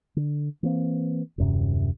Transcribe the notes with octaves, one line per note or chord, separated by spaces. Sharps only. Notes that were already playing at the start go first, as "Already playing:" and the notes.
D3
E3 A#3 C4
D#1 F#2 C3